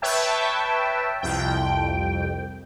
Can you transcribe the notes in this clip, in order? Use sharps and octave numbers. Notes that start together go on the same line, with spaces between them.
B4 C#5 E5 G5 A5
C2 F2 G5